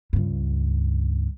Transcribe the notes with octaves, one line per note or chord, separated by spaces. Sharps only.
C#2 G2